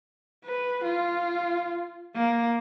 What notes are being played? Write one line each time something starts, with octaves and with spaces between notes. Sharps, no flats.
B4
F4
A#3